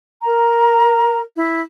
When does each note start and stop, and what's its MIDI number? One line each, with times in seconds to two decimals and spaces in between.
0.23 1.20 70
0.23 1.20 82
1.34 1.61 64